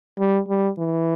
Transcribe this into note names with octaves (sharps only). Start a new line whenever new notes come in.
G3
G3
E3